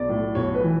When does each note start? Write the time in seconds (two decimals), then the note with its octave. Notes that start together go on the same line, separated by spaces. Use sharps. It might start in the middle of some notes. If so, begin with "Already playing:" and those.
Already playing: B1 D5
0.09 A2
0.35 B1 C#5
0.54 B4
0.63 E3